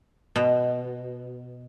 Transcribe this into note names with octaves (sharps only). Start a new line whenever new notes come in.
B2